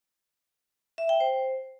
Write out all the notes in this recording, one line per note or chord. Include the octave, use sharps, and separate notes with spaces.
E5
G5
C5